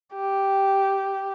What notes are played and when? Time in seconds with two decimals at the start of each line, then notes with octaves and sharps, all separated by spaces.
0.15 G4